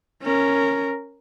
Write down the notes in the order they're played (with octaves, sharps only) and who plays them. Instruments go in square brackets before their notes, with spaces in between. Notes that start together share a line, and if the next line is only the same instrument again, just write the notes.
[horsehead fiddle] C#4 A#4